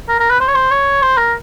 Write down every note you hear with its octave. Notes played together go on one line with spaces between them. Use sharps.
A#4
A#4
B4
C5
C#5
C5
C#5
C5
A#4